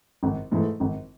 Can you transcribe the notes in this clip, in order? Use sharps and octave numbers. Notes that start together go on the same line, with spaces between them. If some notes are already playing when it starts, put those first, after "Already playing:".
G#1
G#2 E3 A3
G#1